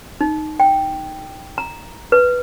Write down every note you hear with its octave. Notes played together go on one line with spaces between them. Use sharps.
D#4
G5
A#5
B4